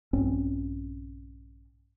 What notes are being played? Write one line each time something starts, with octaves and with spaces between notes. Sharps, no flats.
A#1 G2 C4 C#4